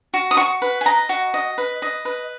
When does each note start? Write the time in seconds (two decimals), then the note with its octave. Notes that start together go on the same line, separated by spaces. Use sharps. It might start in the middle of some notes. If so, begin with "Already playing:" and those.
0.14 F#4
0.31 D#6
0.37 F#4 C#6
0.62 B4
0.81 G#5
0.85 D#5 A#5
1.09 F#4
1.34 D#5
1.58 B4
1.82 D#5
2.05 B4